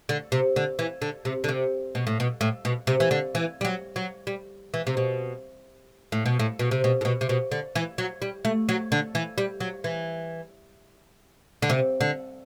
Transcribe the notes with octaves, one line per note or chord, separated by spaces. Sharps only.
D3
C3
D3
E3
D3
C3
D3
C3
B2
A2
B2
A2
B2
C3
E3
D3
E3
G3
F#3
F#3
G3
E3
C3
B2
A2
B2
A2
B2
C3
B2
A2
B2
C3
B2
D3
E3
F#3
G3
A3
F#3
D3
E3
G3
F#3
E3
D3
C3
D3